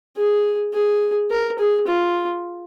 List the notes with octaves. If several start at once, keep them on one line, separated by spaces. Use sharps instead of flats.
G#4
G#4
A#4
G#4
F4